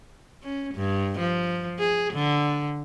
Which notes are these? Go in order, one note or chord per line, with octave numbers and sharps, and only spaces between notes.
C#4
G2
F3
G#4
D3